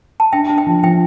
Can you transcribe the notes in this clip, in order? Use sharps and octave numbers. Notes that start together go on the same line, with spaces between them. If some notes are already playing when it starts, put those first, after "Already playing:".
A5
D4 E5 G5
D4
E5 G5
F3
F3 E5 G5